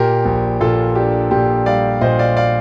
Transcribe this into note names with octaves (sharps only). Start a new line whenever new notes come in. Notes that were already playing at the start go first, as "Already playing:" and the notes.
Already playing: A#2 G4 A#4
A#1
A#2 F4 A4
D4 G4
A#2 G4
G3 D5 F5
A#2 C5 D#5
D5 F5
D5 F5